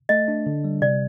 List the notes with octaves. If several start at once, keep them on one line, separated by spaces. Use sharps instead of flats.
A3 D#5
D4
D3
G3
C3 D5